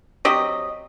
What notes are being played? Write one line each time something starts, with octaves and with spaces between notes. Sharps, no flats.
F#3 C4 G4 D#5